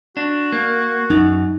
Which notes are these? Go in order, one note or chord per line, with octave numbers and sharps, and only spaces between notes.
D4 F#4
A#3
F#2 D#4